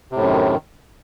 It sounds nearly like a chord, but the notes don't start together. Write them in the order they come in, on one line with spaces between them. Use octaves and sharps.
C3 A2 F#2 D#3